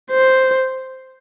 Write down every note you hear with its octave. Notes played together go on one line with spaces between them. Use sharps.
C5